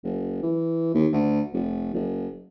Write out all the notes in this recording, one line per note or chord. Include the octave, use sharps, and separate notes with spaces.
F#1
E3
D#2
D2
F1
F#1